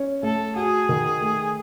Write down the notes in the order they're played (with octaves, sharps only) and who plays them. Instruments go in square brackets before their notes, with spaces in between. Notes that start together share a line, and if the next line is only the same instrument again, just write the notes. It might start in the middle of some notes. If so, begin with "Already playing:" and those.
Already playing: [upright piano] C#4 C#5
[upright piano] A3 [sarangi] A4
[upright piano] F#4 [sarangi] G#4
[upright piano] D#3
A3